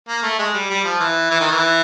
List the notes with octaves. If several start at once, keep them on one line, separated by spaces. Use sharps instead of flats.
A#3
A3
G#3
G3
G3
F3
E3
E3
D#3
E3